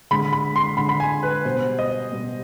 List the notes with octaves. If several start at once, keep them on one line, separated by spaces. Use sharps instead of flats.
D3 G#3 B5
B5
C6
D3 G#3 B5
B5
G#5
B4
B2 G3 C5
D#5
B2 G3